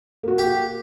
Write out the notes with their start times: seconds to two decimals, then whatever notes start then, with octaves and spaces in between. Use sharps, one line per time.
0.23 A#3 F#4
0.38 G4